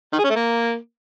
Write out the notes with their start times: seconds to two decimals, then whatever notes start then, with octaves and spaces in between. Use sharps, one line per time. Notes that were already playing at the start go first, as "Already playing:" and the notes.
0.13 D#3
0.19 G#4
0.24 C#4
0.30 A3
0.36 A#3